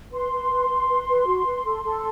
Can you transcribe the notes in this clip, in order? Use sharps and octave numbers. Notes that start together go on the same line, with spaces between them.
B4 C6
B4
B4
B4
B4
B4
F#4
B4
A4
A4